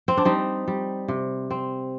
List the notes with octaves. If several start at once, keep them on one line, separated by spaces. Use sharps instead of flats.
C4
D4
G3 C4 D#4
G3
C3
C4